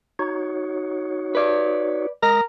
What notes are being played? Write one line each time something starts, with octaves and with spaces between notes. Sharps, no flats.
D#4 F#4 C#5
B4 D5
G#3 A#4 D#6 A#6